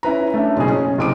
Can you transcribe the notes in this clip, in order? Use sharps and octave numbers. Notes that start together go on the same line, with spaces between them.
C#4 E4 B4 A#5
A3 C#4 D4 E5
F#1 B2 G#4
C#4
F#1 C3 D6 D#6 D7